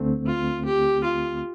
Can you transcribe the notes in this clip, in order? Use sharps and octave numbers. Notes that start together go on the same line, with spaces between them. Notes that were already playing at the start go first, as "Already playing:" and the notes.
Already playing: D2 D3 A3 C4
F4
G4
F4